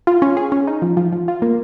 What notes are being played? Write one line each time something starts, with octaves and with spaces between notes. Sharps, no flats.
F4
C#4
G#4
C#4
D#4
F3
F3
F3
F4
A#3